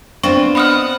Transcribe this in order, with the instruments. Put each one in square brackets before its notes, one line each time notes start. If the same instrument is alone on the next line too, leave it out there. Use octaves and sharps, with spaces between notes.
[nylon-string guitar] B3 D4 [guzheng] C4 F4 [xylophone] C#6
[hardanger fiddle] D#5 F#5 [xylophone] B5 D#6 F6